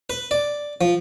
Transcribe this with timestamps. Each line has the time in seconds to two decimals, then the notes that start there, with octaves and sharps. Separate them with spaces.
0.10 B4
0.31 D5
0.81 F3